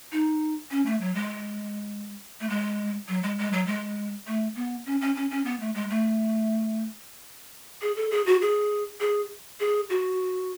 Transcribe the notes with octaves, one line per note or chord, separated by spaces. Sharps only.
D#4
C#4
A3
F#3
G#3
A3
G#3
F#3
G#3
G#3
F#3
G#3
A3
B3
C#4
C#4
C#4
C#4
B3
A3
G#3
A3
G#4
A4
G#4
F#4
G#4
G#4
G#4
F#4